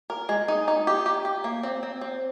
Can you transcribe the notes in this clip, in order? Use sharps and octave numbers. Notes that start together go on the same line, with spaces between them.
A#4
G#3
D#4
D#4
G4
G4
G4
A#3
C4
C4
C4